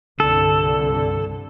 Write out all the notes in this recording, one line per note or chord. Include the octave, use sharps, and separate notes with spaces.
C2 G2 D3 A4